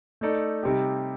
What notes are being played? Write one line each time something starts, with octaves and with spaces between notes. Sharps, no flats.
A3 D#4 A4 D5
C3 G3 C4 D#4 G4